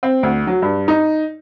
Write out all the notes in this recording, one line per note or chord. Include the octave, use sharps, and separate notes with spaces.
C4
D2
F#3
G2
D#4